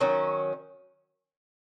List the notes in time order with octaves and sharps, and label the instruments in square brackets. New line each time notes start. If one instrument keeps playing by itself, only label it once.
[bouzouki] D#3 F#3 C#4